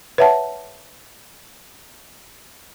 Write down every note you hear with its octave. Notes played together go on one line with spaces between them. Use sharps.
B4 C#5 E5 F#5 A5